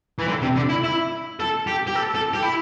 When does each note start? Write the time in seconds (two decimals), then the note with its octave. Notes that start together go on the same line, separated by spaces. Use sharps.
0.19 E3
0.28 D3
0.42 C3
0.56 D3
0.69 E4
0.84 E4
1.40 A4
1.67 G4
1.87 G4
1.95 A4
2.15 A4
2.34 G4
2.43 E4